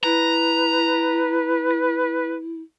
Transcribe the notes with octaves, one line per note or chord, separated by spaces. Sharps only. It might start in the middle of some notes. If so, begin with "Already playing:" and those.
E4 B4 A#5